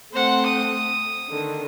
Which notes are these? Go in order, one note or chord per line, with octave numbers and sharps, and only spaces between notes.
A3 C4 C5 F#5
D#6
D3 D#3